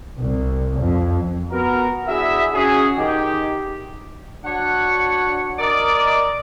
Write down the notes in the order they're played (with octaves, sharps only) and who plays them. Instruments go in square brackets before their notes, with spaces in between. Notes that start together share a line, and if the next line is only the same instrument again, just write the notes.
[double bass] C2
F2
[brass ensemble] B3 F#4 A#4
D4 E4 F#4 G#4 E5
C#4 F#4 G#4
D#3 D#4 G4
[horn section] D4 F#4 C#5 F#5
A#4 D5 D#5